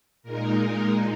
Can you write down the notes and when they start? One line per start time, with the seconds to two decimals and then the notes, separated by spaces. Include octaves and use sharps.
0.23 A#2 G#3 D#4 A#4
0.55 A#4